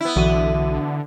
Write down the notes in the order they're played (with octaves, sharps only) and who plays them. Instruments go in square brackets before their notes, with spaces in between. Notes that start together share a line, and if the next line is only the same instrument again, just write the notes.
[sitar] B3 E4
[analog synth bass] B1 [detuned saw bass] D3 [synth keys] E3 F#4 D#7